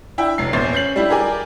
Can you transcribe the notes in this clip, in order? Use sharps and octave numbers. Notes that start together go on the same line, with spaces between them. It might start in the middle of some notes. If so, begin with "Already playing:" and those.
D4 E4 E5 G5
F1 F#3 C7
A#1 E2 C5 C#5 A6 C7
C#4 G6 C7 F#7
G3 D4 E4 G4
G4 G#4 A#4 D5 G#5